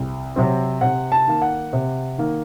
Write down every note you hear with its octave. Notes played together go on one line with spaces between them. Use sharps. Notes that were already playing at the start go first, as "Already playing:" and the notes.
Already playing: C2
C3 F#3 C4
C3 F#5
A5
D#3 A#3
F#5
C3
D#3 A#3